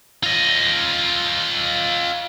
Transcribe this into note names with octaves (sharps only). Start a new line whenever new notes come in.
F4 D#5